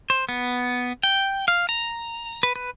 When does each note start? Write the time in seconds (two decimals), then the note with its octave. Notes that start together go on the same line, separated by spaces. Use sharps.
0.10 C5
0.29 B3
1.03 G5
1.48 F5
1.69 A#5
2.43 B4
2.56 B4